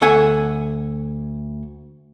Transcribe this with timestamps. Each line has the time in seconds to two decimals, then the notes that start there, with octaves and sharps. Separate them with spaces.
0.01 D2 A4 F#5 G#5